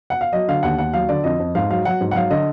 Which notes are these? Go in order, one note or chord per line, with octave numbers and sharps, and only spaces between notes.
F#5
F5
F#3 D#5
D3 F5
D#2 F#5
D#2 F#5
F#3 F5
D3 D5
F2 D#5
F2
G#2 F5
F#3 F5
F#3 F#5
G#2
F#5
F#3 F5
D3 D#5